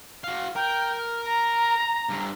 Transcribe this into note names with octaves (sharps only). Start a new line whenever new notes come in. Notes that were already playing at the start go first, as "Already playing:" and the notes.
F#4 F5
A#4 G5
F6
A#5
G2 D3